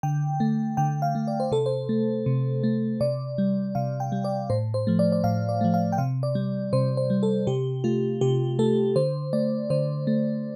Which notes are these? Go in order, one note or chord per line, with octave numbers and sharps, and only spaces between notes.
D3 G5
A3
D3 G5
F5
A3
D5
C5
C3 A4
C5
A3
C3
A3
C3 D5
G3
C3 F5
G5
G3
D5
A2 C5
C5
F3 A3
D5
D5
A2 F5
D5
F3 A3
F5
G5
C3 F5
D5
G3
C3 C5
C5
G3
A4
C3 G4
A3 F4
C3 G4
A3 A4
D3 C5
A3 D5
D3 C5
A3